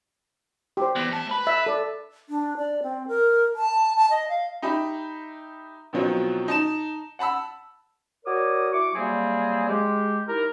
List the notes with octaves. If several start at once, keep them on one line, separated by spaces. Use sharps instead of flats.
G4 C5
E2
A3 A5
B4 B5
E5
A4 D5
D4
D5
C4
A#4
A5
A5
D#5
F5
D#4 G4 E5 B5
B2 D#3 F3 F#3 C4
D#4 A5 E7
F#5 A5 B5 E6
F#4 A#4 C#5 D5 D6 D#6
E4 F#4 C#6 D6
C3 F#3 G3 A#3 C4 G#4
G#3 G4
D#3 E4 G4 A#4